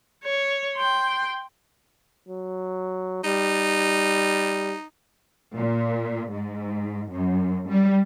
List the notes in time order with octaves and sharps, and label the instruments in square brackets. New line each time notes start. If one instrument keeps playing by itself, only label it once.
[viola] C#5
G5 C6
[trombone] F#3
[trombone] G3 [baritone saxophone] D#4
[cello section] A#2
G#2
F#2
G3